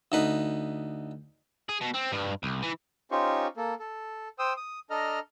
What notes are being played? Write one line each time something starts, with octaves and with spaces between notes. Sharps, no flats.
D2 D#4 B4
G#4
B2
C4
G2
C2
E3
C#4 D#4 F4 G4 C5 C#6
A#3 A4
A4
C5 G5 D#6 E6
D#6
D4 A4 D#5 A#5 F6